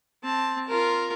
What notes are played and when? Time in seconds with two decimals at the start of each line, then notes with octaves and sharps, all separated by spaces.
0.23 C4 A5
0.68 F4 A#4